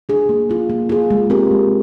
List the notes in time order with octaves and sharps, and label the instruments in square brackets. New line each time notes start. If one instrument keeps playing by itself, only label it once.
[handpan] D4 G#4
A#3
F4 G#4
A#3
F4 G#4
G#3
C4 G4 A#4
G#3